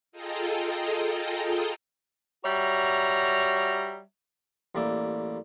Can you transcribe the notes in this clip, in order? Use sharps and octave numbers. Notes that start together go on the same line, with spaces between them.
F4 G#4 A4 D#5 G5 A#5
G3 F#4 C#5 E5 A#5
A1 G3 A#3 D5 E5